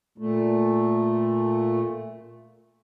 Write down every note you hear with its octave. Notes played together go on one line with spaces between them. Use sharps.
A#2 A3